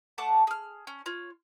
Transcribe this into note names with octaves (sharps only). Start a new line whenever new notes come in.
A3 F#5 A5 D6
G#4 F6
C#4
F4 C#5